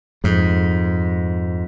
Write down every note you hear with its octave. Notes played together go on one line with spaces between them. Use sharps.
F2 G#2